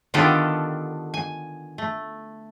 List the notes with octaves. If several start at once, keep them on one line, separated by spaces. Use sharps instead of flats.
D3 D#3 B3 F4 G4 A4
G#5
A3